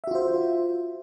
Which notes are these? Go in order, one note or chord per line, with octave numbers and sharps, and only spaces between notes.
F4 F#4 C5 E5